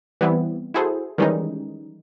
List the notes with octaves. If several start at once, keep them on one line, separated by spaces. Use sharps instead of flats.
E3 G3 B3 C4 E4
E4 F#4 G#4 A4 C5
D#3 E3 G3 G#3 C#4 D#4